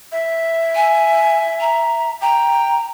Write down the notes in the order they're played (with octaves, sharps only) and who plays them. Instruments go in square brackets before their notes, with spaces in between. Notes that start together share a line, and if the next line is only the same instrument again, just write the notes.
[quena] E5
[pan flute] G#5
A#5
[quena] G5 [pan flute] A#5